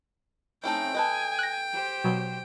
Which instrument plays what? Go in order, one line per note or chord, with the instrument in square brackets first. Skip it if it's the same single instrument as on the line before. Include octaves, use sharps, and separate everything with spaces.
[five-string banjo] A3 C#4 E4 [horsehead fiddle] C4 D#4 [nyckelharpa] G5
[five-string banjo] A4 B4 D#5 [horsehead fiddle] G#5
[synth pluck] F#6 A#6
[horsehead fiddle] G4 C5
[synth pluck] B2 F#3